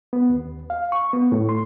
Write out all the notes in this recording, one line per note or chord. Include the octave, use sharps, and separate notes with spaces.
B3
D#2
F5
C#6
B3
A2
C6